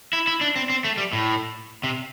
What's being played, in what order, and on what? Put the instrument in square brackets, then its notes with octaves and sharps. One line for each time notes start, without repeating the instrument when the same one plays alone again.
[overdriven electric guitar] E4
E4
D4
C4
C4
A3
G3
A2
C3